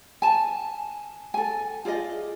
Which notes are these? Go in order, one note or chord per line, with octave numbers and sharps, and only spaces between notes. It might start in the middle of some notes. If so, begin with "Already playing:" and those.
G#5 A5
A4 G#5
F4 G#4 D5 D#5